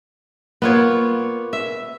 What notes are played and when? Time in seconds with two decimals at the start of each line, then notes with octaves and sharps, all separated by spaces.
0.62 A#3 B3 F4 C#5
1.53 E5